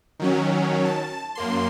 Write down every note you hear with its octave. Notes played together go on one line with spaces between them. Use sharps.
D#3 F#3 C#4
A5
F#2 A#3 C6